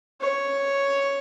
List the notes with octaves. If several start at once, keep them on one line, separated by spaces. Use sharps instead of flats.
C#5